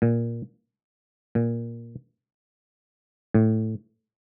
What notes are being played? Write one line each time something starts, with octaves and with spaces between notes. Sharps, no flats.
A#2
A#2
A2